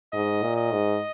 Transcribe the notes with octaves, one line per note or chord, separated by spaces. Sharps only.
G#2 D#5
A#2
D#5
G#2